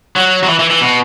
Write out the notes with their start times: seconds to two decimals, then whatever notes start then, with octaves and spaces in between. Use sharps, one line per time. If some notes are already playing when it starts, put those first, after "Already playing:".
0.16 F#3
0.43 F#3
0.49 E3
0.59 E3
0.70 E3
0.81 B2